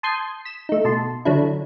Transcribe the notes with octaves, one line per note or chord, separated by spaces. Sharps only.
A5 C6 D#6 G6 G#6 C7
B6 E7
A3 D#4
B2 A5 C6
D3 F#3 D4 E4